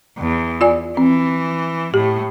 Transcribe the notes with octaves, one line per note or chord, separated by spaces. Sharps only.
E2
F4 D5 G#5
E3 C4
A2 G4